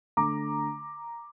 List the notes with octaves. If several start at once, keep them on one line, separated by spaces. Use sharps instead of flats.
D3 A3 A#5 D6